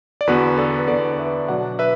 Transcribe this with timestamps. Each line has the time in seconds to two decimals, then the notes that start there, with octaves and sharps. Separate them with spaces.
0.21 D5
0.27 E2 D3 B3 F#4 B4
0.58 A4 D5
0.79 B4
0.88 E2 D3 B3 A4 D5
1.13 D5
1.19 B4 E5
1.48 B2 F#3 D4 D5 F#5
1.79 B4 E5